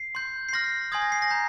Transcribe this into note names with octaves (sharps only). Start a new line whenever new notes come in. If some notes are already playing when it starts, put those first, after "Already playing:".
Already playing: C7
C6 G6
C7
C6 F6 A#6
G#5 C6 D#6 G#6
A#6
C7
A#6
A#5 G6